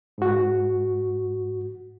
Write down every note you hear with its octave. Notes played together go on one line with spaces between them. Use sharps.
G#2 F#4